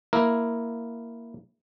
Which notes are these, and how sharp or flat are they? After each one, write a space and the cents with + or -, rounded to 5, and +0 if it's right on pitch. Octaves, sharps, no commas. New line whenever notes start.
A#3 +0 E4 +0 A#4 +0